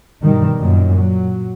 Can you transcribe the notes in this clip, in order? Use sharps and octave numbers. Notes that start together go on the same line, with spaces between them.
G2 B2 D#3 G3
F#2 A#2 D#3
F#3